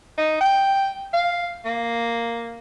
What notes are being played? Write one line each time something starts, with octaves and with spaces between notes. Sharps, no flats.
D#4
G5
F5
A#3